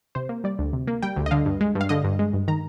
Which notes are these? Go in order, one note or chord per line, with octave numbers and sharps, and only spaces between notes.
C3 C5
A#3
G3 D5
D2
C3
A#3
G3 G5
D2
D#5
D3 F5
G2
G#3
G2
F5
D3 D#5
G2
G#3
G2
D#3 A#5